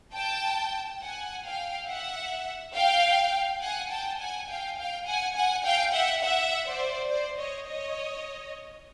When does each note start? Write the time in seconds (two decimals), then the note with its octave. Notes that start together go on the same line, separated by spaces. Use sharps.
0.14 G5 A5
1.01 F#5 G#5
1.44 F5 G5
1.88 E5 F#5
2.74 F5 G5
3.61 F#5 G#5
3.90 G5 A5
4.19 F#5 G#5
4.48 F5 G5
4.77 F5 G5
5.06 F#5 G#5
5.35 F#5 G#5
5.64 F5 G5
5.93 E5 F#5
6.22 E5 F#5
6.66 C5 D5
7.09 C5 D5
7.38 C#5 D#5
7.67 C#5 D#5